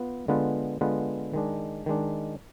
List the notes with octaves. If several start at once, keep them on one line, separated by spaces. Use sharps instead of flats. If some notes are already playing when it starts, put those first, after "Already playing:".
Already playing: B3 F4 B4
D3 G#3 B3 F4 B4
D3 G#3 B3 F4 B4
D#3 G#3 D4
D#3 G#3 D4